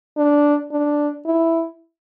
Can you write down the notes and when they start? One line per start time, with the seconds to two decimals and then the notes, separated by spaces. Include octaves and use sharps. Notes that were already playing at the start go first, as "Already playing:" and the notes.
0.17 D4
0.72 D4
1.26 E4